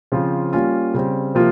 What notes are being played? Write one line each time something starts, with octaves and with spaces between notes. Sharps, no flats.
C#3 F3 C4 F4
G3 A#3 C#4 F4
C#3 G3 C4
C3 F3 A#3 F4